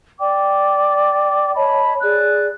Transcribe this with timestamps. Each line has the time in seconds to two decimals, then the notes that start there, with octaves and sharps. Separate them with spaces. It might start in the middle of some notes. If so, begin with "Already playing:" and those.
0.20 D5 G5 D6
1.56 C#5 D#5 A5 B5
2.02 G#4 D5 F#6